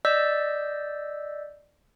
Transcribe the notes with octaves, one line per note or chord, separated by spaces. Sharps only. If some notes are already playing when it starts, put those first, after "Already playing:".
D5 D#5 E6 G6 B6